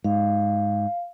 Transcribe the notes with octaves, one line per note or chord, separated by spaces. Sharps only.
G#2 F5